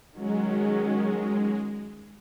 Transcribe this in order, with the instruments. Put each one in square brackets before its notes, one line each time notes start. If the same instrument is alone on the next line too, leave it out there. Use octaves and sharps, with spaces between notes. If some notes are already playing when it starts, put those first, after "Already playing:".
[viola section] D#3 F#3 C#4 G#4 [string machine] G#3